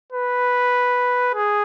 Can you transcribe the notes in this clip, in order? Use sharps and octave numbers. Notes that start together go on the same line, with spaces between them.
B4
G#4